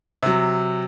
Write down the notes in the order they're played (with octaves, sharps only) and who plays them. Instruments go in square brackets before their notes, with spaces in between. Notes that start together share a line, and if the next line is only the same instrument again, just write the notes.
[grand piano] C3 F#3